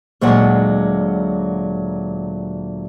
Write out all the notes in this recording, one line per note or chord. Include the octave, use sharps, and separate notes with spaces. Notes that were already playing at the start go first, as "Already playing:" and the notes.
D2 A#2 F#3 G#3 F#5